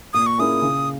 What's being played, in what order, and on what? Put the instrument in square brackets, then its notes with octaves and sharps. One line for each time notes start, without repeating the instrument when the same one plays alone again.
[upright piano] A#2 [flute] D#6
[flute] C#6
[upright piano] A#3 C#4 E4 G#4 [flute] D#6
[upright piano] C#3